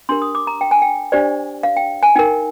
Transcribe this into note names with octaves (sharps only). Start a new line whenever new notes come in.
D4 G4 A#4 C6
D#6
D6
A#5
G5
G#5
G5
D4 G4 C5 D5
F5
G5
G#5
D#4 A#4 G5